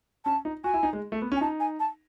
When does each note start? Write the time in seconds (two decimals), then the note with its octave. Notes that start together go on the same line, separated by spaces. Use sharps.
0.25 C#4 A5
0.45 D#4
0.64 F#4 G#5
0.74 E4
0.83 D#4
0.93 G#3
1.12 A3
1.22 B3
1.32 C#4
1.36 G#5
1.41 D#4 A5
1.60 G#5
1.80 A5